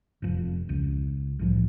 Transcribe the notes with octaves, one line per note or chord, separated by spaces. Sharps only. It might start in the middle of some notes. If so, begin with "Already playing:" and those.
F1 F2
C#2
C2 A2 F3